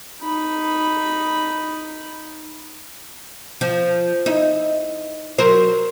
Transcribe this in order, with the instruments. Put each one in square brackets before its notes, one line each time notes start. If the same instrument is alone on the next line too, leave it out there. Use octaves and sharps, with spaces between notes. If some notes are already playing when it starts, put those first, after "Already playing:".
[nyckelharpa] D#4 B5
[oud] F3
D#4 E4
F#3 A#4 C5